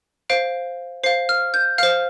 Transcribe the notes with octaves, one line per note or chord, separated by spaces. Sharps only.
C5 F5 D7
C5 F5 C7
F6
G6
C5 F5 F6